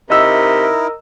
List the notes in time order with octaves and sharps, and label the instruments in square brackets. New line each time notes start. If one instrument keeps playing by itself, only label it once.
[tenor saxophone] C3 [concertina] D#4 E4 [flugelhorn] A#4 [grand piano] D#5 E6